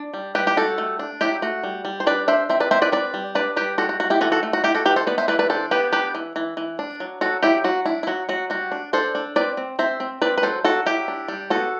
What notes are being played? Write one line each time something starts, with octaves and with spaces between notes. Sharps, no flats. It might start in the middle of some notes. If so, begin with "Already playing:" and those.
Already playing: D4
G3
G3 G4 B4
G4
G3 F#4 A4
A3
D4
F#3 E4 G4
A3 F#4
G3
G3
C5
D4 B4 D5
D4 C5 E5
C4 C5 E5
B4 D5
C4 C5 E5
B4 D5
C4 B4 D5
G3
D4 B4 D5
G3 G4 B4
G3 F#4 A4
F#4
G3 F#4
E4 G4
E3 F#4 A4
F#4 A4
A3
F#4
D4 E4 G4
F#4 A4
E3 G4 B4
A4 C5
B3 B4 D5
C5 E5
E3 B4 D5
B4 D5
D4 A4 C5
B3 G4 B4
D4 G4 B4
E3
E3
E3
D4
F#3
F#3 F#4 A4
F#3 E4 G4
F#3 F#4
D4 E4
E4
F#3 F#4
F#3 F#4
G3 F#4
D4
D4 A4 C5
D4
C4 B4 D5
C4
C4 C5 E5
C4
C4 B4 D5
B4
F#3 A4 C5
F#3 F#4 A4
F#3 E4 G4
D4
G3
B3 F#4 A4